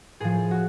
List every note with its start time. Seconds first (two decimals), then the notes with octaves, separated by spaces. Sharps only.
0.20 A2 F3 G#4
0.51 F#4